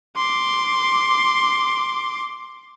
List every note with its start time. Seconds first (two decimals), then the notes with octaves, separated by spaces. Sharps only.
0.17 C6 D6